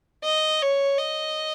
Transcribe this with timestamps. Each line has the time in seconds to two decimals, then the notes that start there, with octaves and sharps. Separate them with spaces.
0.24 D#5
0.62 C#5
0.99 D#5